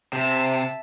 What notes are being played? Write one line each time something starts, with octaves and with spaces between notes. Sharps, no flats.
C3 E5 A5